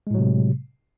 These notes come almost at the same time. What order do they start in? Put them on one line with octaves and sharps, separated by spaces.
G#3 A2 F#3 C3